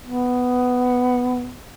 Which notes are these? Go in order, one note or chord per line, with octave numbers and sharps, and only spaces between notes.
B3